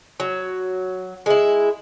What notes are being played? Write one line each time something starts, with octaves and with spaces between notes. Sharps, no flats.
F#3
G#3 E4